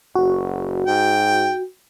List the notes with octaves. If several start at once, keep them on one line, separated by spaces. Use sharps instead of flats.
F#1 F#4
G#2 G5